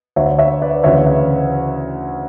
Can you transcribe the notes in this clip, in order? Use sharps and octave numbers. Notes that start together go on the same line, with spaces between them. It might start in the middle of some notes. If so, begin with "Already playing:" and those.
D2 D3 C#5 E5
C#5 E5
B4 D5
D2 C#3 E3 C#5 E5